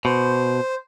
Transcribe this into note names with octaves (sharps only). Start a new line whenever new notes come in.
B2 C5